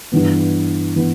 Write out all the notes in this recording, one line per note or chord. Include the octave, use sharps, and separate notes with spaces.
G2 E3 B3
E3 B3